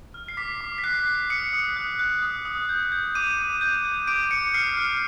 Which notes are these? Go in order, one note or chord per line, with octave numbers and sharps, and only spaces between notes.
F6
C7
D6 B6
D6
B6
F#6 C7
F#6
D#6 C#7
D#6
F#6
F#6
D#6
D#6
G6
G6
D6 D#7
D6
G6
G6
D6 D7
D6 C#7
F6 C7
F6